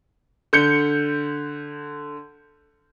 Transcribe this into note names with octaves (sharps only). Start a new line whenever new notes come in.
D3 G6 C#7